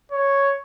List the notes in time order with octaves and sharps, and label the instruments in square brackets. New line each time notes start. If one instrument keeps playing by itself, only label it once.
[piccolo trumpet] C#5